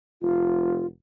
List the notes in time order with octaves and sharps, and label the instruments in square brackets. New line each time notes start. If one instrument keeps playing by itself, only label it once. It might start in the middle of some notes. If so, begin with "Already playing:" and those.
[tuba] F1 [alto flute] F4